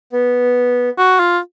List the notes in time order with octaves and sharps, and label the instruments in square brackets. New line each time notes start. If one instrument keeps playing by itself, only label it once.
[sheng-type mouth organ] B3
[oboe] F#4
F4